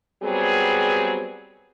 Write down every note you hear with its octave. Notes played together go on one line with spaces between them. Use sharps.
F#3 G3 B3 C4 G#4